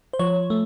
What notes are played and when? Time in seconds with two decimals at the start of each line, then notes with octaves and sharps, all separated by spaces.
0.13 C5
0.19 F3 C#5
0.50 A3